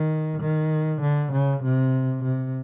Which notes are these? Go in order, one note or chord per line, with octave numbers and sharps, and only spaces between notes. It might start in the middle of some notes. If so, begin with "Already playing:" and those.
Already playing: D#3
D#3
D3
C#3
C3
C3